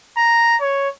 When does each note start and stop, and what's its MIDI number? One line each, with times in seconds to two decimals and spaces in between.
0.17 0.56 82
0.61 0.89 73